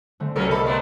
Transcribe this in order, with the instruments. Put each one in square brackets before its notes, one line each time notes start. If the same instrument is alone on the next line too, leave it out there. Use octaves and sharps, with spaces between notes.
[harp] D3 A3 C4
[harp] C2 [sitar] F#3 G3 C#4 [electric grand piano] A4 A#4
[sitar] A4 [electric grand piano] D#5 [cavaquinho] B5 D6
[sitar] A3 B3 C4 [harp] B4 A#5 C6